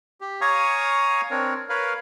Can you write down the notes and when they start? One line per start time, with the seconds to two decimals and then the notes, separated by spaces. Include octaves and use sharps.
0.21 G4
0.41 C#5 F5 G#5 A#5 C#6 D#6
1.31 C4 D4 A#4 C#5
1.69 A#4 B4 C#5 F5